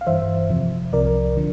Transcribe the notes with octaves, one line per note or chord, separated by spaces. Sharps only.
F5
G2 E3 C5 E5
F2 C3 F3
C2 C3 F3 A#4 D5
D3 F3